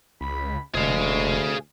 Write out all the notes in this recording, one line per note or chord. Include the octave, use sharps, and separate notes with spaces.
C#2 B5
F1 D2 B2 G#3 G#4 F5